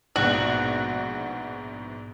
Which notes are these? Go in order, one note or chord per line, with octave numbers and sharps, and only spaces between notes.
A#1 G#2 B2 F#4